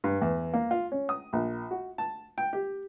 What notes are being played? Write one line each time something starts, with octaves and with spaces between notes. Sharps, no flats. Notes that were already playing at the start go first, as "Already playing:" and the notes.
G2
E2
A#3
F4
C#4
D#6
A#1
F#4
A5
G5
G4